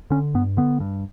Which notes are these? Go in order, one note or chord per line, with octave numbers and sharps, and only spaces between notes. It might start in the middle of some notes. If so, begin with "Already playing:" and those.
D3 C#4
G2 B3
D3 B3
G2